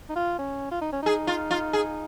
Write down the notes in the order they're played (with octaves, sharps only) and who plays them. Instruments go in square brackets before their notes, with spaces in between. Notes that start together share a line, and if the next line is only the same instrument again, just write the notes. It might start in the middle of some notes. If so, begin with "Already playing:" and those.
[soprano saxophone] D#4
F4
C#4
F4
D#4
C#4
[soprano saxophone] D#4 [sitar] G#4
[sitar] F4
F4
G#4